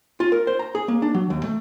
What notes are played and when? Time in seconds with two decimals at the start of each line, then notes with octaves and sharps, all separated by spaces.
0.20 F4
0.32 A#4
0.47 C5
0.59 A#5
0.75 G#4
0.88 A#3
1.02 D4
1.14 F#3
1.30 D#2
1.44 A3